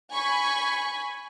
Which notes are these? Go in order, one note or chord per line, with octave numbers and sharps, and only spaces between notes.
G#5 B5 C#6